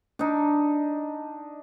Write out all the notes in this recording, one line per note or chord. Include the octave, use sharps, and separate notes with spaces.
D4 D#4